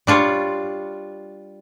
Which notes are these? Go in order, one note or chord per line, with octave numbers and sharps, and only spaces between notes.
G3 D4 F4 C#5